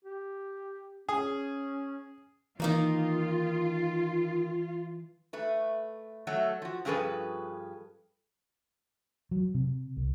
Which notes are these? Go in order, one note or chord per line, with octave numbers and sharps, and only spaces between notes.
G4
C#4 G#4
D#3 E3 A#3 D#4 F4
A3 B4
F#3 A3 F#4 A4
F3 F#4
G2 F3 C#4 G#4 A4 B4
F#3
C3
C2